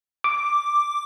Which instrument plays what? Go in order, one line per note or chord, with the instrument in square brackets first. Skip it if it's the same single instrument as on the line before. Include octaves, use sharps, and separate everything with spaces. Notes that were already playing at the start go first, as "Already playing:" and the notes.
[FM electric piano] D6